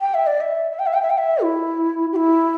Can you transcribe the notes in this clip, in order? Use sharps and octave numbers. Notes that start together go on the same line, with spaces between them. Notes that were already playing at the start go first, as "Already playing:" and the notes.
G5
E5
D5
E5
E5
G5
E5
G5
E5
G5
E5
E4
G4
E4